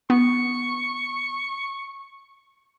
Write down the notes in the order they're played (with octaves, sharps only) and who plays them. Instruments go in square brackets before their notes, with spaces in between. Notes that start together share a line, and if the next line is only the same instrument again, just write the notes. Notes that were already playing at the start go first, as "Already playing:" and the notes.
[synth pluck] B3 [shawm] C#6